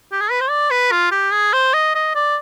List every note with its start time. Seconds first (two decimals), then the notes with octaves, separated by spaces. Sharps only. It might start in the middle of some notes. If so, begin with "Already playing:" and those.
0.12 G4
0.21 G#4
0.31 B4
0.41 C5
0.50 D5
0.71 B4
0.92 F4
1.12 G4
1.33 G#4
1.53 C5
1.74 D#5
1.95 D#5
2.15 D5